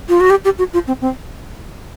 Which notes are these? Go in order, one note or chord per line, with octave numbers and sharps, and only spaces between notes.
F4
F#4
G4
G4
F#4
F4
C4
C4